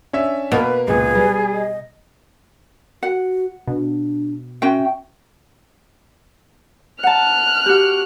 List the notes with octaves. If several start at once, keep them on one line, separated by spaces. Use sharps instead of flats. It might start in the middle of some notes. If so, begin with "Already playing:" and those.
C#4 D4 E5
B2 A#3 A#4 B4
C#2 A#2 G#4 B4
G3
D#5
F#4 F#5
B2 D4
C#4 F#4 E5 G5
F#5 A5 F6 F#6
F#4 G4